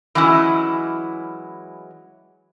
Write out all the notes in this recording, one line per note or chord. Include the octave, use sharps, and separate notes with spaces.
E3 F#3 G#3 C#4 E4